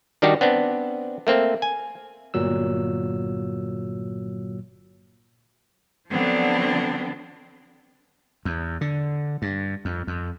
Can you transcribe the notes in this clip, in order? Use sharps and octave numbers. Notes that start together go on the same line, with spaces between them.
D#3 G3 D4 D#4 F#4 G4
B3 C4 D4
A3 A#3 C4
G#5
G1 A#2 F#3 E6
D3 F3 F#3 B3 C4 D4
E2
D3
G2
F2
F2